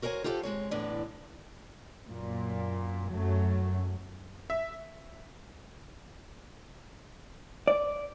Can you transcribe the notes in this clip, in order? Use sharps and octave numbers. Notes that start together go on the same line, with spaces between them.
F#4 A#4 C5 C#5 G#5
F4 G4 A4 C5 F5 F#5
G#3 C4 C#5
E2 A2 D3 D4 B4
F#2 A#2
F#2 F#3 A3
E5
D5